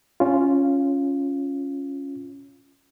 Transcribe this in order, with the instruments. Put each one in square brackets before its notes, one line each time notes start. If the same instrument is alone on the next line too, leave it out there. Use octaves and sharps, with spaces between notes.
[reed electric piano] C#4 F4